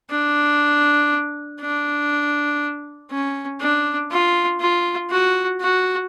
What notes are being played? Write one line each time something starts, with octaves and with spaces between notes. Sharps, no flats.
D4
D4
C#4
D4
F4
F4
F#4
F#4